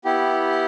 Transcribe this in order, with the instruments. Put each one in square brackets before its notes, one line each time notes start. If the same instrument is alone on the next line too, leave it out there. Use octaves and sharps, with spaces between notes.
[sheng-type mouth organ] B3 E4 G4